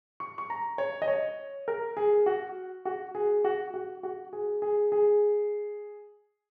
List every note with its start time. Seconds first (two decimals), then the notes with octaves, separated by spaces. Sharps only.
0.20 C#6
0.38 C#6
0.50 A#5
0.78 C#5
1.02 D#5
1.08 C#5
1.68 A#4
1.97 G#4
2.26 F#4
2.85 F#4
3.15 G#4
3.44 F#4
3.74 F#4
4.03 F#4
4.33 G#4
4.62 G#4
4.92 G#4